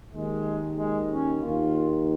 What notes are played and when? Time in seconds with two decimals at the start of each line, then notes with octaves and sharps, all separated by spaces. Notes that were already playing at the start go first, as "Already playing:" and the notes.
0.11 D#2 D#3 G#3
0.77 G#3
1.10 C#4
1.42 D#2 D#3 F4